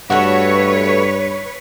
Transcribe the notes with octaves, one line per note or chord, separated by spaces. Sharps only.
G2 A3 F#4 B4 C#5